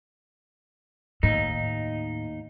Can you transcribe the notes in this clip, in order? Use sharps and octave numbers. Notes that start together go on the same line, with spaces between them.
D#2 A2 D#4